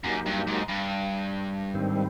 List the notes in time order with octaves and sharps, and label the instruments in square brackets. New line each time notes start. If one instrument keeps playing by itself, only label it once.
[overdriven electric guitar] F#2 [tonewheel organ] F#3 A#3 D#4 G4
[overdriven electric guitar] G2
G#2
G2
[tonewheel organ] G#2 D#3 G3 C4